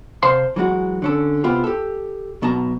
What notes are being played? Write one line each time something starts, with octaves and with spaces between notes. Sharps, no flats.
C3 C5 F5 A5 C6
E3 F#3 G#3 F#4
D3 C#4 A4
C3 B3 E4 F4 G4
G4 A4
B1 B2 F#3 A5 A#5